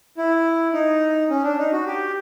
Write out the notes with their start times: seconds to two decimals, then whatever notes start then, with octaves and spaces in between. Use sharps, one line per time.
0.18 E4
0.73 D#4
1.30 C#4
1.44 D4
1.58 D#4
1.72 F#4
1.86 G4